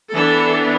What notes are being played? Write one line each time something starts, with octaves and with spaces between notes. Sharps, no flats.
E3 B3 D4 A4